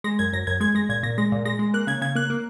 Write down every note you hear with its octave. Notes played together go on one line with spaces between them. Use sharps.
G#3 A#6
F#2 G#6
F#2 A#6
F#2 G#6
G#3 G#6
G#3 A#6
A#2 G#6
A#2 A#6
G#3 A#6
A#2
G#3 A#6
G#3
A#3 F#6
C#3 G#6
C#3 G#6
A#3 F#6
A#3